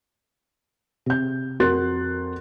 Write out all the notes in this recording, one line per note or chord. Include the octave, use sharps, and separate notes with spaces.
C3 G6
F2 F#4 A#4 C6 F#6 A6